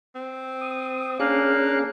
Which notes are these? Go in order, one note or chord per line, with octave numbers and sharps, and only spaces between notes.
C4
D#6
A#3 C#4 D4 G#4 F5 F#6